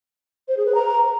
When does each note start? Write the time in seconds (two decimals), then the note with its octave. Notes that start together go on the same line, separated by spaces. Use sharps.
0.48 C5
0.57 G#4
0.66 B4
0.75 A#5